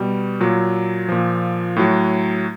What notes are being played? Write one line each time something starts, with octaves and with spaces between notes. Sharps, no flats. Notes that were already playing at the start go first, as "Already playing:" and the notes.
Already playing: B2 G3
A#2 F#3
A#2 F3
A2 F#3